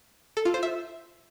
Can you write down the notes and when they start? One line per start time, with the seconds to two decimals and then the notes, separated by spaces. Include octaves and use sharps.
0.37 A4
0.45 F4
0.54 C5
0.63 E5